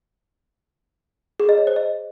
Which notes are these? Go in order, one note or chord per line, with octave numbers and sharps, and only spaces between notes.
G#4
D#5
C#5
C5
D#5